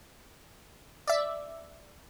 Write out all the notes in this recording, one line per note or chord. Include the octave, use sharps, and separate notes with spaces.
D5 E5